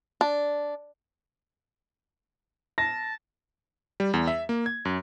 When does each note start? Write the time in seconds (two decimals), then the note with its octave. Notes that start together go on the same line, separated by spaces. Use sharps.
0.21 D4
2.78 A5 A#6
4.00 G3
4.14 E2
4.27 E5
4.49 A#3
4.66 G#6
4.85 F#2